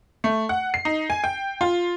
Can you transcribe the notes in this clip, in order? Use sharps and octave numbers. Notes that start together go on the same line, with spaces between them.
A3
F#5
C7
D#4
G#5
G5
F4